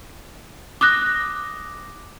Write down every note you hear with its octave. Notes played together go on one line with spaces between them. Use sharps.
D6 D#6 F#6 A#6